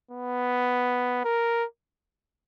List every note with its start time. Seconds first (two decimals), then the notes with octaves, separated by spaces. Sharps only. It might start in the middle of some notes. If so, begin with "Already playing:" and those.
0.11 B3
1.24 A#4